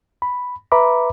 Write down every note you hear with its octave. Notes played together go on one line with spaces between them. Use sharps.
B5
B4 E5 A#5 B5 D6